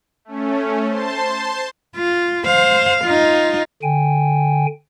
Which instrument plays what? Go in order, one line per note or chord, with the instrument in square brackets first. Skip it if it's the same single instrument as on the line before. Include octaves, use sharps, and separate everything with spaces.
[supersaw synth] A3 C#4
C5 A5 C6
[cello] F4
C5 F5
D#4 F4
[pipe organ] D3 G5 G#5